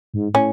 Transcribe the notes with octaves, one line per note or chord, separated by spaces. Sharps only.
G#2
A2 C#4